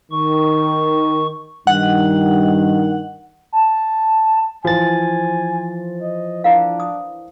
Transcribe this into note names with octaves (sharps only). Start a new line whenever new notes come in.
D#3 C#6
G2 D#3 F#5
A5
E3 F3 F#4 C5 G#5 A6
D#5
D4 E4 A#4 F5
D#6